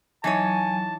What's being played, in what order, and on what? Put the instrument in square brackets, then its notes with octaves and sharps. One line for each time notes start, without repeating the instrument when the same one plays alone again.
[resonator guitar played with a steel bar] E3 D#4 C#5 [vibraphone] F#3 [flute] G#5 [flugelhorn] A5